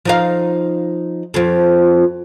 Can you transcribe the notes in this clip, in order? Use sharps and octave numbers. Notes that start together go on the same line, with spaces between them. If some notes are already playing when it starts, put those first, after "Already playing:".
F3 D#4 F5
F2 F3